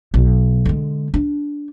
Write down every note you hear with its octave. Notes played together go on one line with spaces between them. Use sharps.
B1
D3 G#3
D4